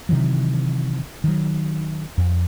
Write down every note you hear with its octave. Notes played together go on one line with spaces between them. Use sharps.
C3 D#3 E3 F#3
D#3 F#3
F2